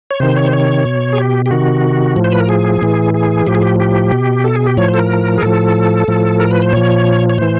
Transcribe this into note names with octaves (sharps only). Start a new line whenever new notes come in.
C#5
C3 D#3 C5
C#5
C5
C#5
B2
G#4
G4
G4
C3 D#3 F#4
A2 F3
C5
B4
A#4
G#4
A2 E3
G#4
A2 F3 G4
G#4
G4
G4
B2
A4
G#4
G4
A2 F3 C#5
C5
A4
A#4
G#4
A2 F3 A4
A2 F3
A#4
B4
C5
A#2 F3 C#5
C#5
A2 E3 C5